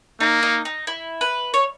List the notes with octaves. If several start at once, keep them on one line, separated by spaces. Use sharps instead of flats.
A#3 D#4
D#4
D#4
E4
B4
C#5